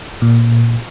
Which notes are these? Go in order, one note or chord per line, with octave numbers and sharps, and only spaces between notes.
A#2